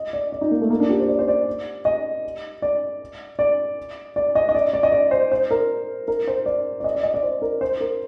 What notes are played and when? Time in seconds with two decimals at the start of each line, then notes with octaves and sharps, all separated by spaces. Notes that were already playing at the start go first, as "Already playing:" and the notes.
Already playing: D#5
0.13 D5
0.32 D5
0.41 D#4
0.51 A#3
0.61 A3
0.70 A#3
0.80 D4
0.89 G4
1.00 C5
1.09 D5
1.19 C5
1.28 D5
1.85 D#5
2.62 D5
3.39 D5
4.16 D5
4.35 D#5
4.49 D#5
4.55 D5
4.73 D5
4.83 D#5
4.92 D5
5.11 C5
5.32 C5
5.51 A#4
6.08 A#4
6.27 C5
6.46 D5
6.80 D5
6.84 D#5
6.95 D5
7.03 D#5
7.14 D5
7.23 C5
7.42 A#4
7.61 C5
7.81 A#4